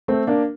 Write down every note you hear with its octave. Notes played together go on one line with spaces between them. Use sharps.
A3 C4
A#3 D4